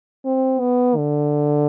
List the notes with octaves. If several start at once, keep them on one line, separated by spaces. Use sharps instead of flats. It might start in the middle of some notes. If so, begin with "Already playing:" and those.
C4
B3
D3